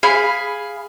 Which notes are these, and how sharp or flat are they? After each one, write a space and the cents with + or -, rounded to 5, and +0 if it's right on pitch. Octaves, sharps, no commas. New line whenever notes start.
G#4 +0 F5 +5 B5 +0